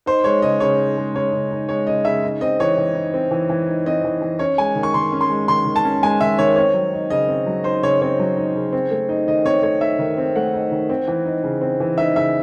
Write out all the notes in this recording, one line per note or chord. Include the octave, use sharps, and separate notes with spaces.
D#4 C5
G#3 C#5
C#3 D#5
C#3 C#5
D#4
G#3
C#3 C#5
C#3
D#4
G#3 C#5
C#3 D#5
C#3 E5
D#4
C4 D#5
E3 C#5
E3
D#4
C4
E3
E3
D#4
C4 D#5
E3
E3
C#4 C#5
G#3 G#5
D#3
C#6
D#3 C6
C#4
C6
G#3
D#3 C6
D#3
A5
C#4
G#3 G#5
D#3 E5
D#3 C#5
C4 C#5
F#3
D#4
C#3 D#5
C4
F#3
D#4 C5
C#3 C#5
C4 C#5
F#3
D#4
C#3
C4
A3
D#4
D#3 D#5
C4 C#5
A3 C#5
D#4 E5
D#3
C4
A3 F#5
D#4
D#3
C4
E3
D#4
C#3
C4
E3
D#4 E5
C#3 E5